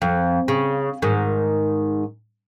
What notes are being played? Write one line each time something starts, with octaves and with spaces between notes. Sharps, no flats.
F2
C#3
G#2 D#3